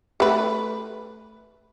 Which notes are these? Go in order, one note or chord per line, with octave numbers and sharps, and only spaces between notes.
A3 B4